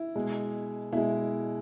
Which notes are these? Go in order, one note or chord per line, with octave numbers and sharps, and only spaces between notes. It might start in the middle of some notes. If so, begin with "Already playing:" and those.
Already playing: E4
B2 G#3
B2 G#3 E4